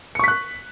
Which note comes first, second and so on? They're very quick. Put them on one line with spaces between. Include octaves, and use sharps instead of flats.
C#7 C#6 B6 F#6